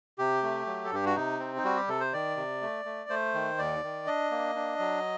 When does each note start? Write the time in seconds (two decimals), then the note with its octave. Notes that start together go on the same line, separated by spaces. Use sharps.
0.18 C3 G4
0.43 A3
0.67 F#3
0.85 A4
0.92 G2 G4
1.06 F#4
1.16 C3 D#4
1.39 C4
1.56 D#4
1.64 G3 F#4
1.77 G4
1.88 C3 A4
2.01 C5
2.13 D#3 D5
2.37 C3
2.62 A3
2.85 A3
3.09 A3 C5
3.34 D#3
3.58 D#2 D5
3.83 D#3
4.06 D4 D#5
4.31 A#3
4.56 D4
4.79 F#3